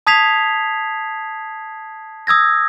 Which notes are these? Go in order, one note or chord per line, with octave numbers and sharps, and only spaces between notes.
A5 D#6 G#6 B6 C7 F7
D#6 E6 G#6 A#6